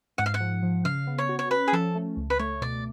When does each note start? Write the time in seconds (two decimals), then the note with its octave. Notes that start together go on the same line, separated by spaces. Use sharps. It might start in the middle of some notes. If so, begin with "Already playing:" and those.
0.18 G#2 F#5
0.26 F5
0.34 F#5
0.40 F3
0.63 F3
0.85 C#3 F5
1.07 B3
1.18 C#5
1.29 F#4
1.39 C#5
1.51 C#4 B4
1.68 G#4
1.73 F3 A4
1.95 A3
2.17 C#2
2.30 B4
2.39 A3 C#5
2.61 B2 D5